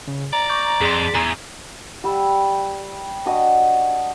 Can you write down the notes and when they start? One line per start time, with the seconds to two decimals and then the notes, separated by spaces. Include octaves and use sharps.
0.07 C#3
0.33 D5 A#5
0.49 C#6 D6 G6
0.81 F2 G#4 C6
1.14 E2 G#4 G#5 A#5
2.04 G3 G5 E6
3.26 D4 F#4 D#5